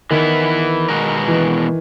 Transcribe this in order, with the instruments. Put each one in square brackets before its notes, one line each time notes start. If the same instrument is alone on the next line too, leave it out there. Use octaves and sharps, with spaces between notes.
[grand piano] D#3 [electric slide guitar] E3 B3 E4
[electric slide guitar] B2 G#3 B3 F#4 A#4
[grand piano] E3